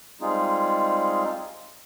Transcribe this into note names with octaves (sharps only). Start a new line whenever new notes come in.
G3 G#3 C4 D#4 F4 G#4